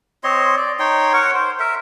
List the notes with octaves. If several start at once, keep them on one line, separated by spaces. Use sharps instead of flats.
C4 C#5 D#5 C6
D5
D#4 C#5 G5 C6
A#4 C#5 F#5 C#6
C5
A#4 E5